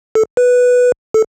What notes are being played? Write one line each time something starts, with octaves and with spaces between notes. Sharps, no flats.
A4
B4
A4